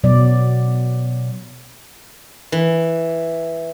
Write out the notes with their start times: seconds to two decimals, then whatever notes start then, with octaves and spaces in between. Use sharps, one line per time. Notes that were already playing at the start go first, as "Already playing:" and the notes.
0.04 B2 F#3 D5
2.52 E3